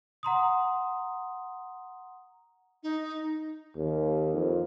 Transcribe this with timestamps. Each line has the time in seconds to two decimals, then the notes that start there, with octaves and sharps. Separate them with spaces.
0.23 F#5 A#5 C6 D#6
2.83 D#4
3.76 D#2
4.34 F2